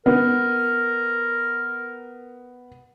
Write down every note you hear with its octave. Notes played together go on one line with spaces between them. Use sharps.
B3 A#4